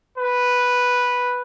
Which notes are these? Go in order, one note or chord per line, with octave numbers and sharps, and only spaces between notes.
B4